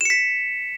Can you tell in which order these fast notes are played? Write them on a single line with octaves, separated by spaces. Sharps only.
E7 C#7 B6